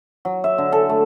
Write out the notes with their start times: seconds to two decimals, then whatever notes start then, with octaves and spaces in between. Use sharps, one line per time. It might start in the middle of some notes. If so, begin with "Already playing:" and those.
0.25 F#3
0.44 E5
0.58 D3
0.72 A4
0.89 A3